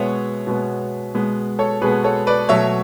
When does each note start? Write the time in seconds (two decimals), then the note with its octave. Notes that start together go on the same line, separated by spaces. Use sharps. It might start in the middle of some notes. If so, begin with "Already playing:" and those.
Already playing: B2 G#3 B3 C#5 E5
0.47 B2 G#3 B3
1.14 B2 G#3 B3
1.59 A4 C#5
1.81 B2 G#3 B3 G#4 B4
2.04 A4 C#5
2.27 B4 D5
2.49 B2 F#3 A3 C#5 E5